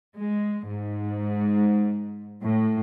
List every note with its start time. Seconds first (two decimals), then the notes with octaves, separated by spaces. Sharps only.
0.18 G#3
0.68 G#2
2.43 A2